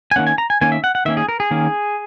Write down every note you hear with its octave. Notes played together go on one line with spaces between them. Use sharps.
G#5
D#3 A#3 C#4 F#5
G#5
A#5
G#5
D#3 A#3 C#4 G#5
E5
F#5
F#5
D#3 A#3 C#4 E5
G#4
A#4
G#4
D#3 A#3 C#4